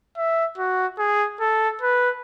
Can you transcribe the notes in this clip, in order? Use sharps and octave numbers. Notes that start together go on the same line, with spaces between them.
E5
F#4
G#4
A4
B4